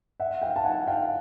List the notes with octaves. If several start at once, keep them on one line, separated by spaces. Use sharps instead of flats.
E5 F#5
F5 G5
A5
F#5 G#5
F5 G5